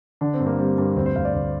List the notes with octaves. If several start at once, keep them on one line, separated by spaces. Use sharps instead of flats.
D3 D4
C4
G2
A#3
G3 C4
G2 A#3
D2 C4
C5
D2 F5
D5
D2 C5